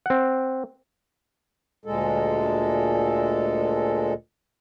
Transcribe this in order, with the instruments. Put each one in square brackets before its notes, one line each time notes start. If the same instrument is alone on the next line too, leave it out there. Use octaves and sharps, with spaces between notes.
[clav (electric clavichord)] C4 F#5
[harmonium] D2 A#2 G#3 A4